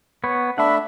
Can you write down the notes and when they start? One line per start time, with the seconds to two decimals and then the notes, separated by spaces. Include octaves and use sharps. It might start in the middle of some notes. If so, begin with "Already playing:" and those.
0.24 B3 B4 C#5
0.58 A3 D4 E5 F#5 B5